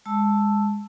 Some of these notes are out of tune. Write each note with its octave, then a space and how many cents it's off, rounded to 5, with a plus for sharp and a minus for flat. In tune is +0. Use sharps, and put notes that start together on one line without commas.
G#3 -15 A5 +0 E6 +0